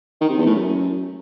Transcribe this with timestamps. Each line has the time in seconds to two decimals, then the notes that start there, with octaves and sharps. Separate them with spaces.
0.21 D#3
0.29 C3
0.38 E2
0.46 A2
0.55 F#2